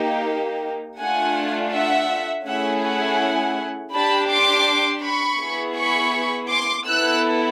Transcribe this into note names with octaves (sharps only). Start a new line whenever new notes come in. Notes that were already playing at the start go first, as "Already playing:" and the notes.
Already playing: A#3 D#4 G4
A3 D4 F4 F#5 G#5
E5 F#5
A3 C#4 E4 G#4 E5 F#5
F#5 G#5
D4 G4 A5 B5
C6 D6
B5 C#6
B3 E4 G#4
B5 C#6
C6 D6
B3 E4 A4 E6 F#6